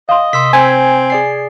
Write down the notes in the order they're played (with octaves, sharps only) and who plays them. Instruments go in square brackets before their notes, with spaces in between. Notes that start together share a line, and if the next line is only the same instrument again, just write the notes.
[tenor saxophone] D#5 [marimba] F5 C6
[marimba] C3 [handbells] C6 E6 B6
[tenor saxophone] C4 [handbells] C5 [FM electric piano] G#5
[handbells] G#4 D5 C7